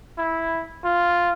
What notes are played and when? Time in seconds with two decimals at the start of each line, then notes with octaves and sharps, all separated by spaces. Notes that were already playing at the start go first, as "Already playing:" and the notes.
0.18 E4
0.84 F4